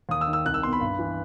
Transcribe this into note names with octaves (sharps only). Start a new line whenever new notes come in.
D#2 D#6
E6
D#3
E6
C2 F#6
E6
B2 C6
B5
G2
E3